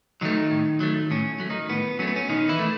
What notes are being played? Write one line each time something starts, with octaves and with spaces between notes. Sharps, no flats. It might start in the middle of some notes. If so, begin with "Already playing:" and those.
D#3 F#3 A3 D#4
A2
F#3 A3
A2 C#4
F#3 A3
D#3 D#4
A2 B3
F#3 A3 C#4
B3
C#4
B2 D#3 D#4
E3 E4
A3